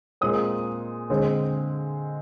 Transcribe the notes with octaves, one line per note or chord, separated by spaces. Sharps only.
A#2 G#3 C4 D#6
D3 G#3 C4